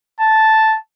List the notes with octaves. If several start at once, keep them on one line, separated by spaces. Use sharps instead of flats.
A5